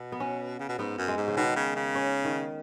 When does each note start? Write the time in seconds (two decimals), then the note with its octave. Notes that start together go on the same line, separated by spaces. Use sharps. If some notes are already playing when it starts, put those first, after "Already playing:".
Already playing: B2
0.12 B3
0.20 C#4
0.60 C#3
0.69 B2
0.78 G#2 B3
0.98 F#2
1.08 G#3
1.17 G#2
1.28 C#3
1.37 B2 D#3
1.56 C#3
1.76 C#3
1.95 C#4
2.24 D#3